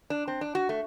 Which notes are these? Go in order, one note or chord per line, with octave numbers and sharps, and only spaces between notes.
D4
C4
D4
F#4
A3